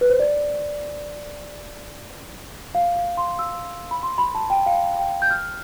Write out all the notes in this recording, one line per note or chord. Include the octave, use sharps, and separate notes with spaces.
B4
C5
D5
F5
F5
C6
E6
B5
C6
B5
A5
G5
F5
G5
G6
F6